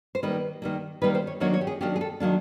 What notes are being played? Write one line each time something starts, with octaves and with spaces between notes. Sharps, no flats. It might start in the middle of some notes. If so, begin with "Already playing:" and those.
C5
D#3 G3 A#3 B4
D#3 G3 A#3
D#3 G3 A#3 B4
C5
C#5
D#3 F#3 A#3 D4 C#5
C#5
G4
G#4
D#3 F#3 A#3 D4 G4
G#4
A4
D#3 F#3 A#3 D4